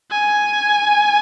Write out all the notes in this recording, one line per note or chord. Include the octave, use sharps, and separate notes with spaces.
G#5